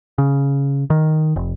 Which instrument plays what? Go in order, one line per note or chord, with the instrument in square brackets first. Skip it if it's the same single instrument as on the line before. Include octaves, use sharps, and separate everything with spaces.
[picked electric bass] C#3
D#3
F1